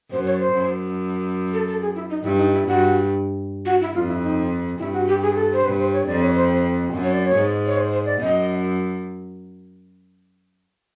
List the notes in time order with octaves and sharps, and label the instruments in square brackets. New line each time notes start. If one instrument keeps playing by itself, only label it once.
[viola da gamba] F#2 [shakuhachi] C5
[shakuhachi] C#5
C5
[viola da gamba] F#2
[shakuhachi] A4
A4
G#4
E4
D#4
[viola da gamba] G2 [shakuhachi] E4
[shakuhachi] D#4
E4
[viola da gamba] G2 [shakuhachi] F#4
[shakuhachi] F#4
E4
[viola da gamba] F2 [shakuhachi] F4
[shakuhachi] E4
D#4
[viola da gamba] G2 [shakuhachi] E4
[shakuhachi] F#4
G4
G#4
A4
C5
[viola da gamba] G2 [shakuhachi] B4
[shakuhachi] C5
C#5
[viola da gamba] F2 [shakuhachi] D5
[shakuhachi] C#5
C5
C5
[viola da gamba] F#2
[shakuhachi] C#5
D5
C#5
[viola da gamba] G#2
[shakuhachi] C#5
C5
C5
D5
[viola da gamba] F#2 [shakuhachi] D#5